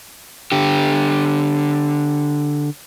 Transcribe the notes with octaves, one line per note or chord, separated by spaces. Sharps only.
D3 G4